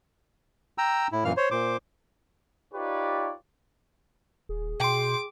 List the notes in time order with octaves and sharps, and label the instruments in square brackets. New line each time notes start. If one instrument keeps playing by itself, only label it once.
[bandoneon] G5 A#5 E6
A2 E4
F#2 A#2 E3 F5 F6
C5 C#5
A#2 C5 D6
[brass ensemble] D#4 F4 G4 B4 C#5 D5
[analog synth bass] D#1 [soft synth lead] G#4
[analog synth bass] B2 [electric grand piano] G5 C6 [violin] D6